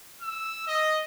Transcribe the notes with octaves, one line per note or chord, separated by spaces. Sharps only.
E6
D#5